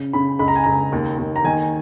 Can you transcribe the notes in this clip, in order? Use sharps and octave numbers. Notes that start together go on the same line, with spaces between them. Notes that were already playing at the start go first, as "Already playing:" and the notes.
Already playing: C#3
C#3 B5
C#2 B5
A#5
G#5
C#2 A#5
D#2
D#2
A#5
D#3 G#5